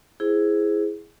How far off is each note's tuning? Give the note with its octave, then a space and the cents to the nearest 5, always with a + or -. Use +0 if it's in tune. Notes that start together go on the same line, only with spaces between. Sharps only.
E4 +0 G#4 +0 C5 +0